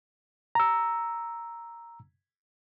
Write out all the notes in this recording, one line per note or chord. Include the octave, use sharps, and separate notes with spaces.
A#5 E6